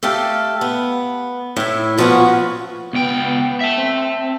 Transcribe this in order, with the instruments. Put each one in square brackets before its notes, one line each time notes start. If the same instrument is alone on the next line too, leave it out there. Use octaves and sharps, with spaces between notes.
[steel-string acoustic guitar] A3 G4 A4 F5
B3
A2 E4
A#2 F3 F#3 B3 C#4 F#4
[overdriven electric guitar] C#2 G5 [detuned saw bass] B3
[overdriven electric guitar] E5 A5
[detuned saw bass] C4